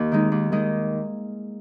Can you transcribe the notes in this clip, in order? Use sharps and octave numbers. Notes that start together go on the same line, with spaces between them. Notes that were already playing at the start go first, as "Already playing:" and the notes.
Already playing: D#2
D#3 G#3 D#4
D#2
D#3 G#3 D#4